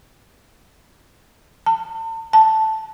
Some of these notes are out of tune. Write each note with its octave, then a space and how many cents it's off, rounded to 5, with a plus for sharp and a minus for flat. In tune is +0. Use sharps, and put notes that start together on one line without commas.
A5 +40
A5 -5